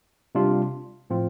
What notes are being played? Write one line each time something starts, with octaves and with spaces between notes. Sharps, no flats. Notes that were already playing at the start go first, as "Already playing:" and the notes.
C3 G3 D4 F4
A2 F3 C4 F4